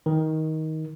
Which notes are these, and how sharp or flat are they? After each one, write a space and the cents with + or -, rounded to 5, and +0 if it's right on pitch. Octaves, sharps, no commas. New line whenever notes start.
D#3 +20